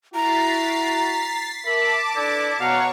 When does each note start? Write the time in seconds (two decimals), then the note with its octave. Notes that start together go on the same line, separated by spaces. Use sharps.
0.14 E4 F#4 A#5 A6 B6 C7
1.66 A#4 E5 A5 B5 D6
2.16 D4 E4 A4 B4 D5
2.60 B2 C#5 F5 F#5 A#5 C#6